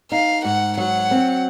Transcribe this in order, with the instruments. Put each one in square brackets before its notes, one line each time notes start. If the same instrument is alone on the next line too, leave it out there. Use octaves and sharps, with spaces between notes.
[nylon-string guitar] D#4 [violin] F5
[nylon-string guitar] G#2 [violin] F#5
[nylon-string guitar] F#3 [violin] F#5
[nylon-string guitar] C4